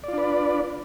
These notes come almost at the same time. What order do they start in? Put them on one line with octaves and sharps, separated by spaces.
D5 F4 D4 B4